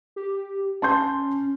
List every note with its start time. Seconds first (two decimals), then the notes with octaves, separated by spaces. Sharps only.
0.16 G4
0.82 C#4 A5 C6 G6